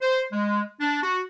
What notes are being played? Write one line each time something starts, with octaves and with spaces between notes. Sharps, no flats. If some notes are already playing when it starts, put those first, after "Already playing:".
C5
G#3
D4
F#4